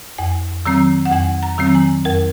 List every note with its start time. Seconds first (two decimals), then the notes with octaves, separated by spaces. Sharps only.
0.18 F2 G#5
0.66 D#3 F#3 C4 A#5
1.05 F#5
1.11 F2 G#5
1.43 A#5
1.58 D#3 F#3 C4
1.67 A#5
1.75 G#5
2.05 F2 A#4